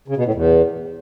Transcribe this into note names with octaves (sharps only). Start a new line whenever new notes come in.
C#3
B2
A2
E2